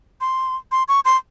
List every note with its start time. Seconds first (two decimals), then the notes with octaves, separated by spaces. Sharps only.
0.21 C6
0.72 C6
0.88 C#6
1.05 C6